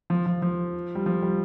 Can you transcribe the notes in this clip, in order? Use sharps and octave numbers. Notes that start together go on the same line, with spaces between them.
F3
F3
F3
G3
F3
G3